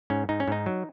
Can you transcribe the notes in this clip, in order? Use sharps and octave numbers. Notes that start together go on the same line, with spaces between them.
G#2 C#4
G#2 D#4
C#4
G#2 D#4
F#3